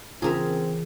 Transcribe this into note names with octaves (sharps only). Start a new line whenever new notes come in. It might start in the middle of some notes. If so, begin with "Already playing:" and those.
C#3 E3 C4 F4 G#4 A#4 E5